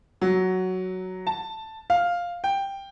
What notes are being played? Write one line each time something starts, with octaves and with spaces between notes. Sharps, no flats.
F#3
A5
F5
G5